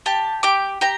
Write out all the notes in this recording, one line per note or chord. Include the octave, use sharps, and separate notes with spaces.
G4 A5
G4 D6
G4 A#5